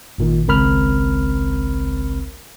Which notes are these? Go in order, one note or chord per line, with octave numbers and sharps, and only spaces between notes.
G#1 A#2 D#3
G#1 C#2 C4 A#4 B5 F6